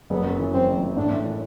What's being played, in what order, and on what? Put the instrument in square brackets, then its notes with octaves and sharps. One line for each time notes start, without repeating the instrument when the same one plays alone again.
[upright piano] F#1 [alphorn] B3
[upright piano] F#2
E3
[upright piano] F#1 [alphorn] C4
[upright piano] F#1
E3
[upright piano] A2 [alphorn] D4
[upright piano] A2
E3